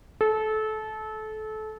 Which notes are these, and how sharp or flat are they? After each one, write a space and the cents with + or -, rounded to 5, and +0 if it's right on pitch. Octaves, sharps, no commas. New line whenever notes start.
A4 -25